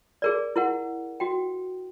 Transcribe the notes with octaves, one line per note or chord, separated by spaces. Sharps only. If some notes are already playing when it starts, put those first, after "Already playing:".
G#4 A#4 D5
E4 A#4 F#5
F#4 G5